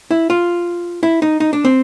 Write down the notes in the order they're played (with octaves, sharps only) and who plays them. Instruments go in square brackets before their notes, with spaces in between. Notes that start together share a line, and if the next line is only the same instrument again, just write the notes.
[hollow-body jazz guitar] E4
F4
E4
D#4
D#4
D4
C4